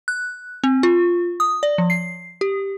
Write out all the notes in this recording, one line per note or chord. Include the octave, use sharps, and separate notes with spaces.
F#6
C4
F4
D#6
D5
F3
C7
G4